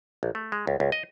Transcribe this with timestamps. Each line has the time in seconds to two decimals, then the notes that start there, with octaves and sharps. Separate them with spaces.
0.23 A#1
0.35 A3
0.52 G#3
0.67 C#2
0.80 C#2
0.92 D#5